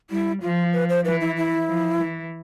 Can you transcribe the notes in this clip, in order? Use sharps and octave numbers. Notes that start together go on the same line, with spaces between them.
G3 E4
F3 F4
B4
C5
E3 B4
E4
E4
F3
E3